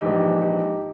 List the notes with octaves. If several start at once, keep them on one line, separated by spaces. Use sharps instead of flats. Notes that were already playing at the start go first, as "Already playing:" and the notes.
A#1 G#2 E3 D#4 G4
D#4 G4